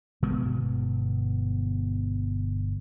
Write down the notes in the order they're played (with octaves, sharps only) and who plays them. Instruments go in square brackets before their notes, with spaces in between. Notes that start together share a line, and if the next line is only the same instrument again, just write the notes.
[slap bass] G1 B2 G#3 B3